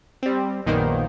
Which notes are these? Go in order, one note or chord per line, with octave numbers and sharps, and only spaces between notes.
G3 C4
A#1 F#2 D#3 A#3 B3 C5